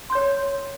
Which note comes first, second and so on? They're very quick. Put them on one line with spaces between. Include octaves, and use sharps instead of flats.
C6 G6 C#5